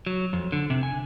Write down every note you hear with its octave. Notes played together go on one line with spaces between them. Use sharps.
F#3
F2
D3
C3
G#5